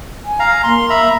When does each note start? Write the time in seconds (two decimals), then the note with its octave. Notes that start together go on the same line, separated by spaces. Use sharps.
0.25 G#5
0.40 F5 A#5
0.64 A#3 C6
0.90 E5 A#5 B5